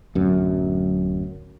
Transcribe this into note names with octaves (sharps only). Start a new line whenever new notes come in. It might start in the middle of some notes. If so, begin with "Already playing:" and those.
D1 F#2